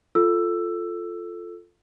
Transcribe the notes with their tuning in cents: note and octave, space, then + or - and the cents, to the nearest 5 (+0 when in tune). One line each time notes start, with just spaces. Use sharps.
F4 +0 A4 +0 E6 +10